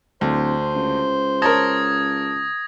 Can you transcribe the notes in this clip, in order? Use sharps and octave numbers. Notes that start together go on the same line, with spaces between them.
D1 D2 C5
C#2
A#4 C#5 A5 D#6 G#6 A#6